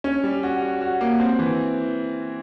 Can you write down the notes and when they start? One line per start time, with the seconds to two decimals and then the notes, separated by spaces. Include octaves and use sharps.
0.04 C#4
0.24 G3
0.43 F#4
0.62 F#4
0.81 F#4
1.01 A#3
1.20 C4
1.39 E3